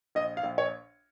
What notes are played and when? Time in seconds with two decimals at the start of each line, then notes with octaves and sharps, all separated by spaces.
0.15 A#1 D#5
0.37 F5
0.44 A#1
0.58 C#5